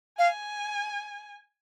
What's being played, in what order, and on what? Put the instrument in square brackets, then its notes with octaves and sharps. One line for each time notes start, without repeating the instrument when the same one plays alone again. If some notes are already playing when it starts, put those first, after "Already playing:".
[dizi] F5 [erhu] G#5